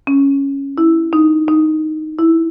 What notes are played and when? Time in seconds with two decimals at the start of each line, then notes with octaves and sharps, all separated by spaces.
0.07 C#4
0.78 E4
1.13 D#4
1.48 D#4
2.19 E4